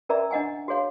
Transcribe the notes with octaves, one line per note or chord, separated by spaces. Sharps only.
C#4 A#4 D5 E5 A#5
D4 D#5 F#5 G#5
F#4 G#4 C#5 F5